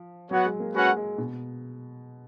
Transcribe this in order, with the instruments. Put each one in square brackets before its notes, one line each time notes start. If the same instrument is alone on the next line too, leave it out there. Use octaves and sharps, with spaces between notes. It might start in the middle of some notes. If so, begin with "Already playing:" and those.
Already playing: [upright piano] F3
[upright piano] F#3 [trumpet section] B3 F#4 C#5 F#5
[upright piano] G#3
A#3
[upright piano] G#3 [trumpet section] C#4 F#4 B4 F#5
[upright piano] G#3
B2